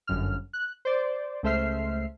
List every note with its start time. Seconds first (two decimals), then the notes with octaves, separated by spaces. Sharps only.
0.07 G1 F#2 F6
0.53 F#6
0.85 C5 D5
1.43 C#2 A3 C5 E5 F6 C7